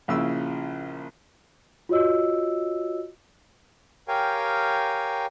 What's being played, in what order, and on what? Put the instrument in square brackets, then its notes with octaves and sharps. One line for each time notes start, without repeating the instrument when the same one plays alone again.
[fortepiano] A#1 C#3 E4 E6
[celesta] F4 F#4 C#5 D#5 E6
[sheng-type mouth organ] G4 A#4 C#5 F5 G5 G#5